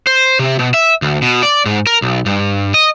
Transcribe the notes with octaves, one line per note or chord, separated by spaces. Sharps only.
C5
C3
B2
E5
D2
B2
D5
G#2
A#4
B1
G2
D#5